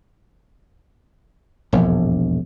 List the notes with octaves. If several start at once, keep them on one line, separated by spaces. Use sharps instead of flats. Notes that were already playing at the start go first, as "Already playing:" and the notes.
E1 A#1 F2 G#2